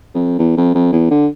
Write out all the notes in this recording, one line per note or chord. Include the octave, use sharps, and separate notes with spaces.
F2
E2
F2
F2
E2
D3